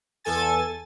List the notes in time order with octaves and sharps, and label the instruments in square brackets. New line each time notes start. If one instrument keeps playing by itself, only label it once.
[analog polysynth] E2 A4 G#5 A6